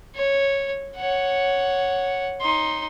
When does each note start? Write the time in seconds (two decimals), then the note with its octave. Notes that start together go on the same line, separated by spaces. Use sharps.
0.15 C#5
0.96 C#5 F#5
2.40 D#4 C6